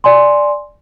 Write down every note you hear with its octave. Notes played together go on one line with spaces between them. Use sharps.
D5 G#5 C6